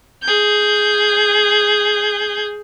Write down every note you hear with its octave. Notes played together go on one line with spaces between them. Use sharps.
G#4 G6